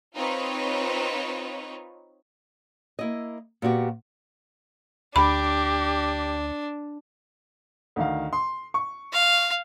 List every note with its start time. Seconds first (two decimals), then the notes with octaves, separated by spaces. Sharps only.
0.16 C4 D#4 F4 B4 C#5
2.99 A#3 E4 D#5
3.62 A#2 B3 F#4 G4
5.16 D2 D4 G4 B5
7.96 D2 D#3 F5
8.33 C6
8.74 C#6
9.13 F5